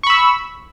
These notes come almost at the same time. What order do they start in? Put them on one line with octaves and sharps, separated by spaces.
C#6 B5 E6